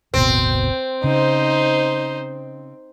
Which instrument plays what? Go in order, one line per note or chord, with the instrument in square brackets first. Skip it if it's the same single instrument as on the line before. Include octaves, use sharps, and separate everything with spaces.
[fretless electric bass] D1 G1 B2 [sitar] C4
[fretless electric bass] C#3 [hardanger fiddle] D#4 C5